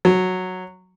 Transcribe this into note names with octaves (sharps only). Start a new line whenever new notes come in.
F#3